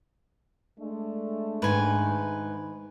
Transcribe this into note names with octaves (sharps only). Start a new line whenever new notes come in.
G#3 A3 D4
G#2 D#3 B4 G#5